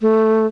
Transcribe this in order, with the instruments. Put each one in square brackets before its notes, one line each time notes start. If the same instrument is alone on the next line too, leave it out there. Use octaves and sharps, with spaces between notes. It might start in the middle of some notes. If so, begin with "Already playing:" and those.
[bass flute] A3